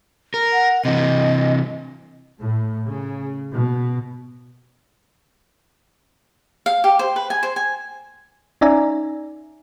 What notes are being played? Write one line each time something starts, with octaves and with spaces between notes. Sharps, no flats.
A#4
F#5
C3 E3 D#5
A2
C#3
B2
F5
G4
C5
B4
G#5
C5
G#5
C#4 D#4 D5 E5 G#5 A#5